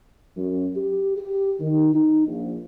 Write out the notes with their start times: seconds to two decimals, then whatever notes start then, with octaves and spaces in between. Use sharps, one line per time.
0.37 F#2
0.76 G4
1.17 G4
1.60 D#3
1.94 D#4
2.27 A#1